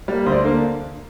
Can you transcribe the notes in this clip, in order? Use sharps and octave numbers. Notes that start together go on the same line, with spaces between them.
G3 A#3
D2 C5
D5
C5
D3 A#3